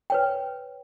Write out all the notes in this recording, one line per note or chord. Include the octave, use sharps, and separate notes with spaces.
B4 C#5 G5